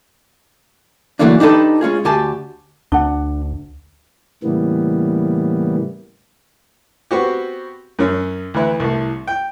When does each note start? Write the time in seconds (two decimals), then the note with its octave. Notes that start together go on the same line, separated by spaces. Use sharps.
1.19 D3 E3 F#3 A3 A#3 D4
1.40 D4 D#4 G4 A4 B4
1.81 G#3 C#4 F4 G#4
2.05 D2 G4 G#5 A5
2.92 D2 D4 F#5
4.43 A2 C#3 E3 G3 A#3 B3
7.11 B3 C4 F#4 G4
7.99 F#2 C#4
8.54 D2 E3 E4 B4
8.80 C2 A2
9.27 G5